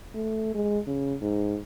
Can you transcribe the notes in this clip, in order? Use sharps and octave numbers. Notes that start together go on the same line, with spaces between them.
A3
G#3
C#3
G#2